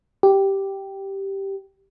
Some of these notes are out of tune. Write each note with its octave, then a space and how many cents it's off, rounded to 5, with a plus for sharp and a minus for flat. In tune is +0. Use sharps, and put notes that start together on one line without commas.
G4 -5